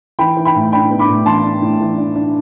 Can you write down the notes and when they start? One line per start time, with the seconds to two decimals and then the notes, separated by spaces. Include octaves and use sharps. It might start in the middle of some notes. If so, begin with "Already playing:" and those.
0.19 E3 G5 B5
0.37 E3
0.45 G5 B5
0.55 A2
0.72 D4 G5 B5
0.90 B3
0.99 B5 D6
1.08 A2
1.26 E3 A5 C6
1.44 D4
1.62 A2
1.81 E3
1.98 D4
2.16 D4